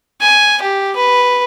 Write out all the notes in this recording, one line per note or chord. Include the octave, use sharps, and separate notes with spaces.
G#5
G4
B4